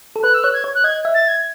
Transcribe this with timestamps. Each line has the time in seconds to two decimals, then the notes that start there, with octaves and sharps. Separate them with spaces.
0.16 A4
0.23 B4 F#6
0.34 E6
0.43 C#5 F#6
0.54 G#6
0.64 C#5
0.75 F#6
0.84 D#5 G#6
1.05 E5
1.15 A6
1.28 G#6